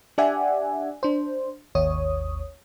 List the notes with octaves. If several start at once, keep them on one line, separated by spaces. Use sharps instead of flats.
D4 G4 D5 E5 F#5 G#5
D4 C5
G#1 D#2 C#5 D#6